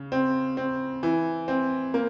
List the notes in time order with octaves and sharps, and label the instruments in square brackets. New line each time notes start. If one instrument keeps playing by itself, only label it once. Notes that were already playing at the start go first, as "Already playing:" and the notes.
Already playing: [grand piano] C#3
C4
C4
E3
C4
A#3